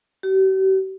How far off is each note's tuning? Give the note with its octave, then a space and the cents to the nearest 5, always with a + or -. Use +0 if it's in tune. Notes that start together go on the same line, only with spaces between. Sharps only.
G4 -45